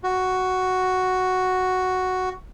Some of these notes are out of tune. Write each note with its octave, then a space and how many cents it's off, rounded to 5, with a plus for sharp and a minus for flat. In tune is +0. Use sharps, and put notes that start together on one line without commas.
F#4 +0